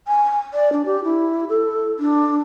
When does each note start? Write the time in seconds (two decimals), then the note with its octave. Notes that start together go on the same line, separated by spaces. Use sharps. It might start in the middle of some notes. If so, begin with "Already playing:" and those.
0.08 G#5
0.54 D5
0.72 D4
0.85 G4
1.04 E4
1.49 A4
1.99 D4